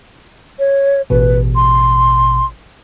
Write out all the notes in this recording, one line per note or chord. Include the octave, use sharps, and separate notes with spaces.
C#5
A1 B2 B4
C6